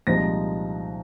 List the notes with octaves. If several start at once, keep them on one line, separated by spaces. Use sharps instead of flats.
C2 A#2 F3 G#3 D#4 A#6